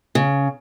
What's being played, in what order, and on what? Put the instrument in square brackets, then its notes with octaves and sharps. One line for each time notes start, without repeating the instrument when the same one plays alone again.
[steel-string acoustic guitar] C#3